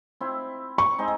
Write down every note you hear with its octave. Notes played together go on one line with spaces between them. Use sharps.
C4 E4
C#6
G#3 C4 D#4